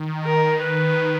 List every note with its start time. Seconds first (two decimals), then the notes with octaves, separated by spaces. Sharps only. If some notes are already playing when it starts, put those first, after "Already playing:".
Already playing: D#3
0.24 A#4
0.61 B4